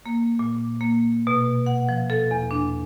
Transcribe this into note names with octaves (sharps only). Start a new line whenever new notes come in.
A#3
A#2
A#3
B2
F#5
F3
A4
E2
D4